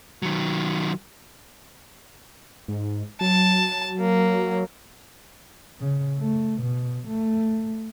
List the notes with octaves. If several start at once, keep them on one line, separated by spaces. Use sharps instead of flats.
D#3 F#3
G#2
F#3 A5
A#3
C#3
A3
B2
A3